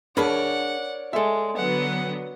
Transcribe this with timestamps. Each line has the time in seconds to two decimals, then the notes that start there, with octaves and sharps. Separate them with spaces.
0.17 D4 G#4 A#4 C#5 D5 F#5 B5
1.13 G#3 A4 E5
1.57 D3 F#3 B3 F#5